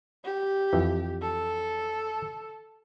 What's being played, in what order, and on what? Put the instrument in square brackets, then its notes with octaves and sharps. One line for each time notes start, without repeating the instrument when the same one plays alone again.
[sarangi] G4
[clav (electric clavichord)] F2 E3
[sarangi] A4